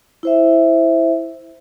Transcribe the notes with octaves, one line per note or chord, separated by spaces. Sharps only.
E4 C5 E5